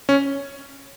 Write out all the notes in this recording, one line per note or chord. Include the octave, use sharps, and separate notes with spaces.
C#4